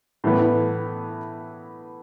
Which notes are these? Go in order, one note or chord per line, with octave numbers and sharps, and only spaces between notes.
A2 E3 B3